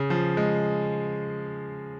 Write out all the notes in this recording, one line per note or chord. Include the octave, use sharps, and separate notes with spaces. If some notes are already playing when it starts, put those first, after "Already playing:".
Already playing: C#3
F3
G#3